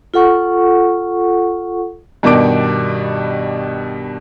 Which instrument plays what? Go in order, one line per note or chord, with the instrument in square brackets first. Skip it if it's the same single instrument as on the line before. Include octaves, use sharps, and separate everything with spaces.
[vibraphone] F4 A4 F#5 C#6
[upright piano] G2 B2 D#3 D4 D6 D7